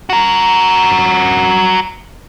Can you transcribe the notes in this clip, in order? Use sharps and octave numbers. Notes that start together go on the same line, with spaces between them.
F#4 A#4